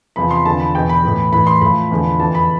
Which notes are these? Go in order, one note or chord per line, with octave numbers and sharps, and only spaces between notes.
E2 C3 F3 B5
C6
E2 D3 F3 A5
B5
E2 B2 G5
B5
A2 E3
A2 E3 B5
C6
A2 F3 B5
E2 D3 F3
F2 E3 A5
B5